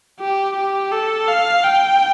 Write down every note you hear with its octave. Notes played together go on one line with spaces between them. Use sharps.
G4
G4
A4
F5
G5